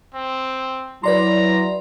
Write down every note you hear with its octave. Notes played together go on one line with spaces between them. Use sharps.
C4
F#3 E4 B4 D5 A#5 C6